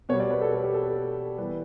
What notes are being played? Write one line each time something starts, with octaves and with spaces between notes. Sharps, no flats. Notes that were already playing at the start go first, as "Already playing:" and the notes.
B2 G3 C#5
D5
B4
A4
A4
G4
A4
E3 G3 B4